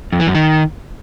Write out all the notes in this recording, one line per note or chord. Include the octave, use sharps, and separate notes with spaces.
F2
E3
F#2
D#3